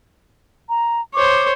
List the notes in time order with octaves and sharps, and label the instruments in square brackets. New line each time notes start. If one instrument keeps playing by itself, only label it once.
[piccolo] A#5
[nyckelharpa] C5 C#5 [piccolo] D6